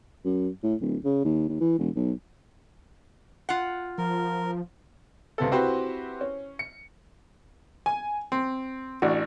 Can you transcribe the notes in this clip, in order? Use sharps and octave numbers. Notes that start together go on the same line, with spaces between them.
F#2
A2
D1
C#3
D#2
D#2
E3
E1
B1
F4 F#5
F3 A#4
C#2 C3 B3 A4
C4 E4 F#4 G4 B4 C5
C#4
C#7
G#5
C4
A1 D4 F#4